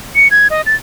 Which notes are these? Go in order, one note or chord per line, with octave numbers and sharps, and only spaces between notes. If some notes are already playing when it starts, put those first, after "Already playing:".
C#7
G#6
D#5
A6